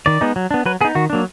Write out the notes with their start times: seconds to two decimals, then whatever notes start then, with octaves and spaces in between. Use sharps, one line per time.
0.06 D#3 D5
0.21 G#3 B3 D#4
0.36 F#3
0.51 B3 D4
0.66 F#3 B4
0.81 B3 G#4
0.85 D#4
0.95 D#3 F#4
1.10 F#3 A#3 D4